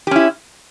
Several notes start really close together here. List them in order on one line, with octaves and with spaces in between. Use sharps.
G4 C#4 E4